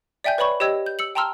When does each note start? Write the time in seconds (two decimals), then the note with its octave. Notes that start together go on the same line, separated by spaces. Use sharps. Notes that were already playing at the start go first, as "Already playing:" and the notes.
0.24 D5 E5 G5 G#5 G6
0.38 B4 C#5 D5 B5 C#6
0.60 G4 C#5 D#5 G5 E6 G#6
0.86 G6
0.99 E6 C#7 F#7
1.15 G5 A5 A#5 C6 E6 F6